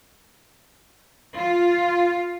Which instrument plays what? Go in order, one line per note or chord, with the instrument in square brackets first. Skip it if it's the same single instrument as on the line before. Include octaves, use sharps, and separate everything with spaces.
[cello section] F4